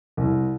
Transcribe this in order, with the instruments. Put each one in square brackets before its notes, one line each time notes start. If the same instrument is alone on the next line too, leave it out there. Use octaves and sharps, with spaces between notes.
[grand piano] C2